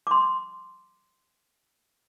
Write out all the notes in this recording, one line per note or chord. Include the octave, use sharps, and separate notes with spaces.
C6 D6